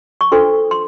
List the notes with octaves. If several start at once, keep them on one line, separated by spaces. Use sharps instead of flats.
C#6
D4 F4 A4 C5 C6
C6